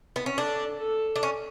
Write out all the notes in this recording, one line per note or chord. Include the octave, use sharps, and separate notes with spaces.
B3
C#4
D4 A4
A4
D4
C#4